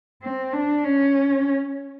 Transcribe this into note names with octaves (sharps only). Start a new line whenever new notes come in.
C4
D4
C#4